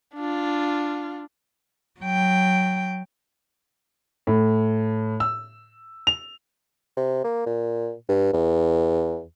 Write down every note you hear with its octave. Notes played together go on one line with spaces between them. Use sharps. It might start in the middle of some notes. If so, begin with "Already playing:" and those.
D4 F4
F#3 G5
A2
E6
F7
C3
A#3
A#2
G2
E2